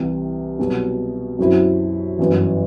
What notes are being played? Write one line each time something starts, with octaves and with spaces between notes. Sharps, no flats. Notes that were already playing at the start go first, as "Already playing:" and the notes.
Already playing: C2 C3 E3
C2 B2 F#3
F#2 F#3 C4 E4
G1 F#2 E3